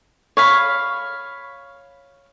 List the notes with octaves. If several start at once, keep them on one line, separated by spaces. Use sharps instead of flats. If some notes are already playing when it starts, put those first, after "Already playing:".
C#5 F5 B5